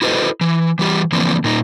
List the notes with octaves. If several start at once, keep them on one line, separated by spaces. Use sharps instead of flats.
E4 F#4 A4 B4 C5 D#5
E3
E3 G3 G4
D3 E3 F3 A#3 C4 D4
A#2 D#4